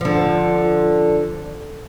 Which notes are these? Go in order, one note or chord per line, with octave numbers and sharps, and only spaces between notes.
D3 F3